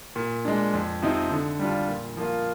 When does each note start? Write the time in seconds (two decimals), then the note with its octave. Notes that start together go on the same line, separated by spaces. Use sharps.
0.16 A#2
0.45 G#3 D4
0.73 F2
1.02 C3 F3 C4 D#4
1.31 D3
1.59 G3 D4 F4
1.88 A#2
2.17 F3 A#3 F4